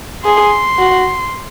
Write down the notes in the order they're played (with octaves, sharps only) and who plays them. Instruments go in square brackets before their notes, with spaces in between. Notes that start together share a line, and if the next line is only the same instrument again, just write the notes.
[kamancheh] G#4 [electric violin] C6
[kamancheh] F#4